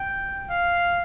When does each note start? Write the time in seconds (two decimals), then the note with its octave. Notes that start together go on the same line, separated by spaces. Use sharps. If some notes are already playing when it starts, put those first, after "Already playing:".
Already playing: G5
0.50 F5